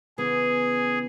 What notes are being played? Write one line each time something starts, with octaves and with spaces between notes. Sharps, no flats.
C#3 E3 B3 G#4